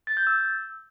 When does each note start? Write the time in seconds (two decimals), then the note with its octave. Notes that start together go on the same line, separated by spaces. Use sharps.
0.07 A6
0.17 G6
0.27 E6